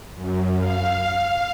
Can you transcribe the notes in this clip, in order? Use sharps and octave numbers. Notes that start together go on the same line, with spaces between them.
F#2
F5